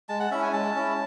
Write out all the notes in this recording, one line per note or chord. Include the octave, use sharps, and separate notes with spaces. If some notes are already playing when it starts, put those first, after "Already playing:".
G#3 A5
F#5
C#4 E4 E5
G#5
G#3 A5
C#4 E4